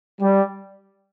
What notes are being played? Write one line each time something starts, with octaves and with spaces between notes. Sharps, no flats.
G3